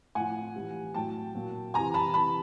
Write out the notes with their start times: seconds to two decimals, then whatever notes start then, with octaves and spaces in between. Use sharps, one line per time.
0.15 A2 F3 F#5 G#5
0.56 A2 E3 G3
0.94 A2 F#3 G5 A5
1.35 A#2 F#3
1.74 C3 E3 G3 G#5 A#5
1.94 A5 B5
2.14 C3 E3 G3 A5 B5